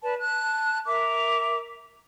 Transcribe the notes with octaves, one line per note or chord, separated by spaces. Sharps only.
B4 D5 A5
A5 F#6
A#4 E5 D6